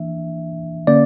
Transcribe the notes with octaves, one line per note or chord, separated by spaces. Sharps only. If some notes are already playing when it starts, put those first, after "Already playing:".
Already playing: E3 A#3 D4 E5
D3 A#3 C#4 D5